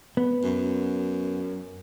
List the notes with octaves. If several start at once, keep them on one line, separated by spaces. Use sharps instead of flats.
B3
F#2